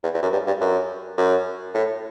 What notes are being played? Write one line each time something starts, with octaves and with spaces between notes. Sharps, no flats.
E2
E2
F#2
G2
G2
F#2
F#2
A2